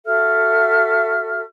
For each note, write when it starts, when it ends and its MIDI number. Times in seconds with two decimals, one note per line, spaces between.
0.06 1.41 66
0.06 1.41 69
0.06 1.41 76
0.06 1.41 89